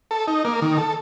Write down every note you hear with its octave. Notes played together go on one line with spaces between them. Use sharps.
A4
D#4
A#3
D#3
A4